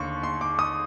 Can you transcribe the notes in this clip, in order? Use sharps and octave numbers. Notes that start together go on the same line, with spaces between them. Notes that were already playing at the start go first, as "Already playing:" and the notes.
Already playing: D#2 D3 C6 C#6
C6
D6
D#6